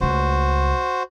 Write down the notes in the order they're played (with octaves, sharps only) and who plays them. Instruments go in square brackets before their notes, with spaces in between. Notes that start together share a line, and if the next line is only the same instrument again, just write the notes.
[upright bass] C#2 A3 [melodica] F#4 C5